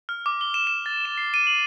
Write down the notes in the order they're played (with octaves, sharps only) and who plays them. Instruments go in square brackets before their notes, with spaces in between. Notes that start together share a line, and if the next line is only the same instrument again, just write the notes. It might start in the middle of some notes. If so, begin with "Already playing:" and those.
[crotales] F6
D6
G7
E7
E7
A6
E7
C7
D#7
F#7